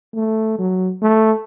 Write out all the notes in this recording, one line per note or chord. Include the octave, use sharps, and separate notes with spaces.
A3
F#3
A3